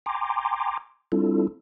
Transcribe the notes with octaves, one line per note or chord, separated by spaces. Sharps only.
G5 G#5 A#5 C6 D6
G3 C4 D4 E4 F4 A4